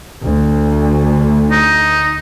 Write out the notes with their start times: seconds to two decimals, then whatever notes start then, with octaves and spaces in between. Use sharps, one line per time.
0.25 D2
1.51 D#4